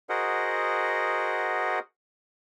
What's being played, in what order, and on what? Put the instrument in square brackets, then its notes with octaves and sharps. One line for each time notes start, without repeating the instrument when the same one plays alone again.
[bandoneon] F#4 G#4 A#4 C5 D#5 F#5